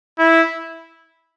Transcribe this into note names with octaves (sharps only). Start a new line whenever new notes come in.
E4